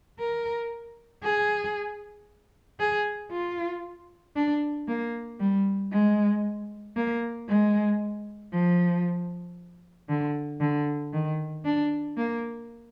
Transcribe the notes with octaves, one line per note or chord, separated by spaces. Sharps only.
A#4
G#4
G#4
F4
D4
A#3
G3
G#3
A#3
G#3
F3
D3
D3
D#3
D4
A#3